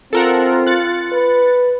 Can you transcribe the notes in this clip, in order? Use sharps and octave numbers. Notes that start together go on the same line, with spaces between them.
C4 F4 A4 A#4 F#5
F#6 A6 C#7
B4